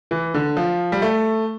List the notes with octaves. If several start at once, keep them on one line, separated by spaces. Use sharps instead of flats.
E3
D3
F3
G3
A3